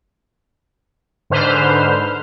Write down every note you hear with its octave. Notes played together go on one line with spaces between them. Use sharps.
G#2 D3 B4 C5 F6